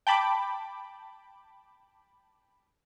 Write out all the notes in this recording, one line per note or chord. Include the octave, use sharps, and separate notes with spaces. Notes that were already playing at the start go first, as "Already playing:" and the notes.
G5 A5 B5 D6